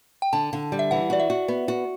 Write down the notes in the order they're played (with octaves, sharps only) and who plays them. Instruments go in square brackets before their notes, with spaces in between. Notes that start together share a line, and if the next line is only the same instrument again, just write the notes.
[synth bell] G5
[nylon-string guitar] D3 [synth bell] A5
[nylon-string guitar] D3
G3
[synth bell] E5
[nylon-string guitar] E3 [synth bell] F#5
[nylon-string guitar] F#4 [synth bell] D5
[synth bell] E5
[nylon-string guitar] F#4
B3
F#4